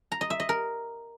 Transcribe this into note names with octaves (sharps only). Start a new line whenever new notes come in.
A#5
D#5
E5
D#5
A#4